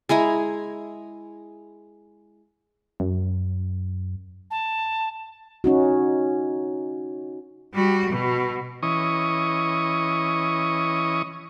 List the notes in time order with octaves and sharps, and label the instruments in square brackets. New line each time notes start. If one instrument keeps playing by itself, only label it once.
[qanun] G#3 E4 G#5 A#5
[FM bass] F#2
[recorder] A5
[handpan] C#4 D#4 F#4
[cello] G3 F#4
B2
[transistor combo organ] E3 C#4 D#5 C#6 D#6